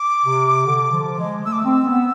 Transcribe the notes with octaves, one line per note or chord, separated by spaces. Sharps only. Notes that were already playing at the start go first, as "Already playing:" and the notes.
Already playing: D6
C3
D3
F3
G#3
A3 E6
D6
C4 E6
B3